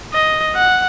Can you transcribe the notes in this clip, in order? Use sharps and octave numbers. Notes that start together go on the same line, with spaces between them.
D#5
F#5